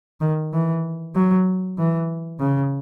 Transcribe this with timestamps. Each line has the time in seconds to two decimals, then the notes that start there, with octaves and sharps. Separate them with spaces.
0.21 D#3
0.53 E3
1.15 F#3
1.78 E3
2.40 C#3